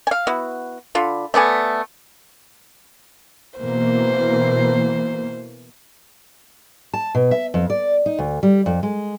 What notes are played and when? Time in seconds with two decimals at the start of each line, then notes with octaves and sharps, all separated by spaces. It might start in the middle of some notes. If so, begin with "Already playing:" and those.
0.07 F5 G#5
0.27 B3 E4 F#4
0.95 D3 F4 B5
1.34 A3 B3 D5 G#5
3.58 B2 E3 A#3 C5
6.93 A5
7.15 B2
7.31 E5
7.54 F2
7.70 D5
8.06 D#4
8.19 D2
8.43 G3
8.66 F2
8.83 G#3